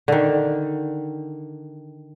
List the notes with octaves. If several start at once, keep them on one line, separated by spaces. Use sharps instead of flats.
D3 D#3